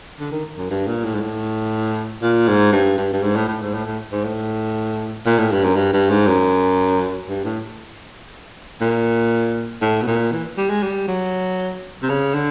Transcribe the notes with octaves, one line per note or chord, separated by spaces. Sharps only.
D3
D#3
F#2
G2
A#2
A2
G#2
A2
A#2
G#2
G2
G2
G2
G#2
A2
A2
G#2
A2
A2
G#2
A2
A#2
A2
G2
F#2
G2
G2
G#2
F#2
G2
A2
A#2
A2
B2
A#2
E3
G3
G#3
G3
F#3
C3
C#3
D3